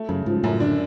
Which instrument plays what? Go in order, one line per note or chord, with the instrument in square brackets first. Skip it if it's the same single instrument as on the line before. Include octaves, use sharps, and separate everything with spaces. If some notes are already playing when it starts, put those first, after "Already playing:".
Already playing: [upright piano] A3
[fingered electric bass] F#2 [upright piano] C#3
[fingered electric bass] G#2 [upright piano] F3
[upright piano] F#2 [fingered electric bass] A2
[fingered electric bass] D3 [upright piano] D4